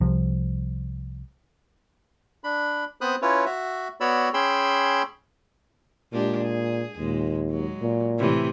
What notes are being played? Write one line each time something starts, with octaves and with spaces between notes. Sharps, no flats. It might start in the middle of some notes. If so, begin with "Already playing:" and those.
C2 C3 F3
D4 B5
B3 C4 C5 B5 D#6 F#6
C#4 E4 F4 B4 C#5
F#4 E5
B3 F#4 C#5 D5 B5 E6
C#4 G#4 G5 B5 C6 E6
A#2 G#3 D4 G4
G#4
D#2 A#2 G#3
F#3 G#3
A#2
A2 C3 E3